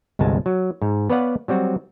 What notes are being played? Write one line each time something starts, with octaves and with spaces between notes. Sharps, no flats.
G1 C2 G#3 G#5 A5
F#3
G#2
B3 B4 C#5 D5 F5 F#5
F#3 G3 C4 F#4